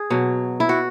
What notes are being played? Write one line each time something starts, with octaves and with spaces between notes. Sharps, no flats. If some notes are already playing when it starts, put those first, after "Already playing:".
Already playing: G#4
B2 F#3
E4
F#4